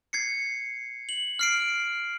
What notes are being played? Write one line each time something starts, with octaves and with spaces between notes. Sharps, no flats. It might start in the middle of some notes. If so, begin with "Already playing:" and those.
G#6 C7 C#7
F#7
F6 C7 D7